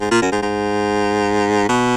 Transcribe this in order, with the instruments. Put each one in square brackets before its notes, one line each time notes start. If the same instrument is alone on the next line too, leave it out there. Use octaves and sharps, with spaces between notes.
[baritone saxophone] G#2
A#2
F#2
G#2
G#2
B2